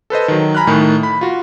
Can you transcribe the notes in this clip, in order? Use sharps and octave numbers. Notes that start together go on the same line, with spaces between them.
A4 B4 C5 D#5
D#3 F#3
G#5 A#5 B5 F6 F#6
A2 D#3 A3
B5
F4 F#4